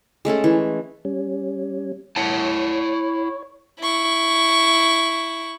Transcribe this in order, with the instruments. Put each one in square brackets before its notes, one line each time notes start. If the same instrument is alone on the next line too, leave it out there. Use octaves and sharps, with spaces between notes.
[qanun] G#3 A3 C#4 A4
E3
[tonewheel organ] G3 C#4
[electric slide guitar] E4 F#5 A5 [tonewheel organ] C#5
[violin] E4 C#6